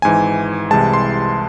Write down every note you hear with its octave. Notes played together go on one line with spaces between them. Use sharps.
G#1 G#2 E3 G#5
C2 C3 E3 G#3 A5
C6